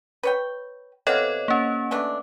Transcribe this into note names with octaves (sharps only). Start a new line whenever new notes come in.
B4 C#5 G5
C3 B3 A4 C#5 D#5 F5
A#3 C#4
E3 A3 D4